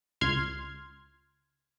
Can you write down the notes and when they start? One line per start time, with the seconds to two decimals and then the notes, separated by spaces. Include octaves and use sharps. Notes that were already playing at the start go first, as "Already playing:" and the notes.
0.21 C#2 C6 F6 G#6